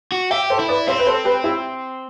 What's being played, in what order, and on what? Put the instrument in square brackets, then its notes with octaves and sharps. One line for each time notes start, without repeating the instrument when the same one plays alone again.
[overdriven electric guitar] F#4
[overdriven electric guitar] G4 [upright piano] E5 G5
[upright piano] A4 C5
[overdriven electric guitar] E4
[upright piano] B4 D5
[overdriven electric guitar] C4 [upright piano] C5 E5
[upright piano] B4
A4 C5
G4 B4
E4 G4